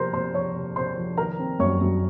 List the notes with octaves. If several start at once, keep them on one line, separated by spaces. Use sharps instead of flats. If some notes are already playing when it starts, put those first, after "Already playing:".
Already playing: C3 F3 A#3 A#4 C5 A#5 C6
C3 C5 C6
F3 C#5 C#6
C3
C3 C5 C6
F3
D#3 A#4 A#5
C4
F#2 C#5 C#6
F#2